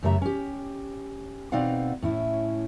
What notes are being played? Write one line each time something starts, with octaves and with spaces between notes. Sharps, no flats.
F#2 C#3 A3 G4 E5 A#5
C#4 G4
B2 C4 D#4 D5 F5 F#5
A2 C#4 E4